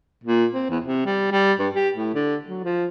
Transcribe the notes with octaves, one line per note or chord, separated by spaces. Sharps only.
A#2
C4
E2
C3
G3
G3
G2
G4
A2
D3
F#3
F3